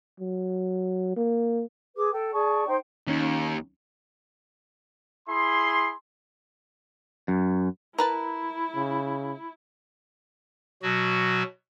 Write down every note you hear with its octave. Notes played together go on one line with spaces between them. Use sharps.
F#3
A#3
G#4 B4 D6
A4 G5
G#4 D5 A5 C#6
D#4 C5 G5
D#2 D#3 C#4 D#4
E4 G#4 C6
F#2
E4 A#4 B4 A5
C#3
B2 F#3 F#4